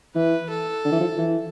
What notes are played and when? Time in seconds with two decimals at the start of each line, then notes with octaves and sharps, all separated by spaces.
0.15 E3 B4
0.50 A4
0.85 D3
0.92 E3
1.00 F3
1.18 E3